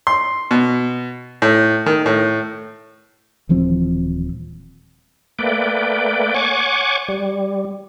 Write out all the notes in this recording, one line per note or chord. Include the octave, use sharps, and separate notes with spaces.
C6
B2
A2
D#3
A2
D#1 E3 F3 C4
A3 A#3 B4 D5 G5
C#5 F#5 G#5 C#6 D6
G3